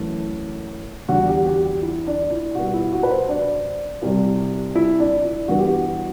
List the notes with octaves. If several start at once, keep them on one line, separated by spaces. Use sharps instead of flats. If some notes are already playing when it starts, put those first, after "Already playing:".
Already playing: F#2 E3 A3
E2 D3 G3 F#4
G4
G4
G4
E4
D4
E4
B2 G3 B3 F#4
E4
F#4
B4
C5
D4
C2 C3 G3
E4
D4
E4
G2 E3 B3 F#4
G4
F#4